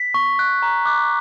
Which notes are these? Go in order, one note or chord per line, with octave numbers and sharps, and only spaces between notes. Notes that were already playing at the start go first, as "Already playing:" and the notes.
Already playing: B6
C#6
F#6
A#5
D6 F#6